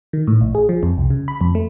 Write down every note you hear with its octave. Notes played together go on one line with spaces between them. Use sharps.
D#3
A2
A#1
G#4
F3
F2
C2
C#3
B5
F2
A3